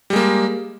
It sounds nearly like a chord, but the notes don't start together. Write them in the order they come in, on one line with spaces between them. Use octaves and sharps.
G3 G#3 A#3